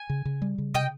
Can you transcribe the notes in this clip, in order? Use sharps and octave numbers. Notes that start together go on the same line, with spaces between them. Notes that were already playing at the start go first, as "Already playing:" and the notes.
Already playing: G#5
C#3
C#3
G3
C#3
C3 D#5 G5